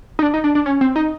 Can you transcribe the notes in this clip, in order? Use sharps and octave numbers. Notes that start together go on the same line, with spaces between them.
D#4
D4
D#4
D4
D4
C#4
C4
D#4